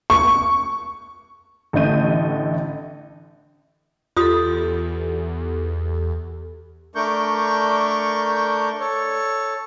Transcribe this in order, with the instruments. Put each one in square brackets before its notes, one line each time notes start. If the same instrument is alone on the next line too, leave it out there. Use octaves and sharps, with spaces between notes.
[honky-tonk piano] C#6
A1 D3 A3 D#5 G6 D#7
[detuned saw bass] E2 [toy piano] F4 C6 D#6 [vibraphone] G4 A4
[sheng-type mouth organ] A3 D4 A#4 C#6 G6
A4 C#5